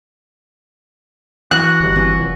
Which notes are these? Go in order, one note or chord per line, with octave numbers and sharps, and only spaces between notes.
E3 F#4 F#6
G1
E3 C4 C#4
F1